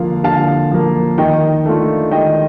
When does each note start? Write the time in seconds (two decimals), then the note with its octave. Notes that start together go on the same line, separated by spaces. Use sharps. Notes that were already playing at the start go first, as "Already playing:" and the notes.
Already playing: D3 F3 A#3 F5
0.24 D3 F5 A5
0.71 F3 A#3
1.18 D#3 D#5 G5
1.66 A3 D4 F4
2.11 D#3 D#5 G5